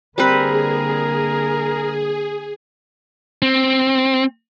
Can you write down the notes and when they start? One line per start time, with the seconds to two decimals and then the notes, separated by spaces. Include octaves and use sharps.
0.18 D3 G3 A#3 C4 G#4 A#4 B4
3.42 C4